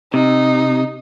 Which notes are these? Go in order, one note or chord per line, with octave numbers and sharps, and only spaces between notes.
C3 D#4